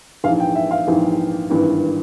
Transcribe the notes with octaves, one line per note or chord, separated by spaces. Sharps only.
A#1 G#2 E3 F5
G5
E5
F5
A#1 G#2 E3
G#1 G2 E3